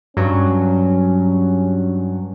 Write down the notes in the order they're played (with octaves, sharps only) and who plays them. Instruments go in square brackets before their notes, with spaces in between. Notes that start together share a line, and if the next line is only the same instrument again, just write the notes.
[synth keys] G2 F#3 [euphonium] C#4